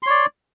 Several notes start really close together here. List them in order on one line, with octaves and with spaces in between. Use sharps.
C6 C#5 D5